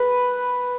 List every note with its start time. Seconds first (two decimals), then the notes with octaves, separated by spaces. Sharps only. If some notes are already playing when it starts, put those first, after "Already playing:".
Already playing: B4